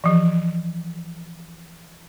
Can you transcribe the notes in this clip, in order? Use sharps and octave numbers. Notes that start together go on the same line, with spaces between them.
E3 F3